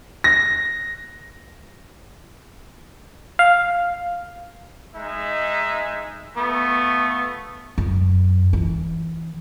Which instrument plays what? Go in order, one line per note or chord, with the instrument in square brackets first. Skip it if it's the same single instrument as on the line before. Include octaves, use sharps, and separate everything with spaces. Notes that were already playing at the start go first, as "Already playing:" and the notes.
[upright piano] A#6
[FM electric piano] F5
[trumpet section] G#3 D#4 E5
[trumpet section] A3 F4 C#6 [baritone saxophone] B3
[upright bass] F#2
E3